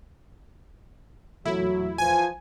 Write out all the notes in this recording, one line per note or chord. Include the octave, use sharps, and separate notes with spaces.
E2 A#2 F#3 A3 E4
E3 F3 G#5